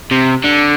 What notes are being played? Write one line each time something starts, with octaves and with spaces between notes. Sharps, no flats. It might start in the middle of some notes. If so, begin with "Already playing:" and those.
C3
D3